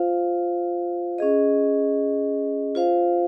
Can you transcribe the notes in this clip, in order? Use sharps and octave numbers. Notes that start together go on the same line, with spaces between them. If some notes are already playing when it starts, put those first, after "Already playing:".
Already playing: F4 C5 F5
C#4 G#4 D#5
F4 C5 F5